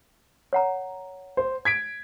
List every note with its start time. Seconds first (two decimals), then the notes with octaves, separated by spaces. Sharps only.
0.53 C#5 F#5 A#5
1.37 C5
1.65 G#6 B6 D7